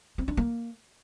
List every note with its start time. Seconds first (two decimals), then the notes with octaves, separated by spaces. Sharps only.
0.18 C4
0.28 D4
0.37 A#3